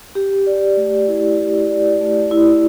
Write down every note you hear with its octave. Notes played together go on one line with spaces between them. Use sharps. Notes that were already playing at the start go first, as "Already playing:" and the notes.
G4
D5
A3
E4
G4
D5
A3
E4